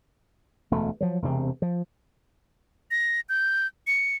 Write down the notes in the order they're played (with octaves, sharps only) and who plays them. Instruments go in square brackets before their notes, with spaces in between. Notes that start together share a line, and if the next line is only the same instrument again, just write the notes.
[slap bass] E1 D2 A3
F3 F#3
E1 C3 C4
F3
[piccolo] A#6
G6
C#7